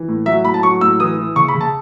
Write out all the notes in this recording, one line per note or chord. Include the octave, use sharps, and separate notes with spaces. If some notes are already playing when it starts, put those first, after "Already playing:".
Already playing: E3
A2
F#3 E5
A2 B5
A5
F#3 C#6
A2 E6
E3 D#6
E3
C#3 C#6
B5
C#3
A5